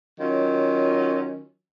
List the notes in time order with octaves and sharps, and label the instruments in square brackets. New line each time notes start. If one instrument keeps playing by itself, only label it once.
[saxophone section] D#3 F#3 C#4 F4